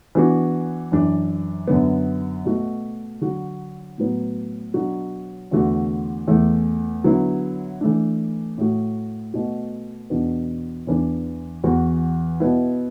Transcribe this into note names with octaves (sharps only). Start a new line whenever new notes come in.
E3 B3 D4 F#4
F#2 E3 D4
F#2 D3 B3
B2 A3 F#4
D3 F#3 D4 F#4
A2 F#3 B3
B2 F#3 D4 F#4
E2 D3 A3 D4 F#4
E2 E3 A3
D3 F#3 B3 E4
E3 A3 D4
A2 A3 F#4
B2 A3 F#4
E2 B2 B3 D4
E2 E3 B3 D4
E2 E3 B3 F#4
B2 B3 E4